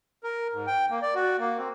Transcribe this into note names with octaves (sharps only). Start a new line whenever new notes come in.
A#4
G#2
G5
A#3
D5
F#4
A#3
C4